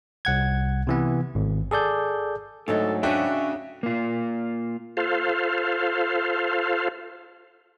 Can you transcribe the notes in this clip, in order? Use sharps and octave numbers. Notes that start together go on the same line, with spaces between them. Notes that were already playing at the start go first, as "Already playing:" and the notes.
C2 F#5 G#6
C3 E3 B3
G#1
G#4 A4 D5 G6
D2 G#2 F#3 D#4 A4
C#3 C#4 D4 F#4 E5 G5
A#3 F4
F4 A4 C5 F5